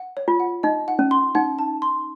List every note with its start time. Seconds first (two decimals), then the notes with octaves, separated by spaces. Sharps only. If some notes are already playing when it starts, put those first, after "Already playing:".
Already playing: F#5
0.17 C#5
0.28 F4
0.40 F#5
0.63 D#4 D#5
0.88 F#5
0.99 C#4
1.11 C6
1.35 D#4 F#5
1.59 A5
1.82 C6